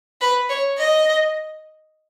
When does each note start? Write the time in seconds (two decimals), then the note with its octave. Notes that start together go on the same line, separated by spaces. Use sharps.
0.21 B4
0.49 C#5
0.78 D#5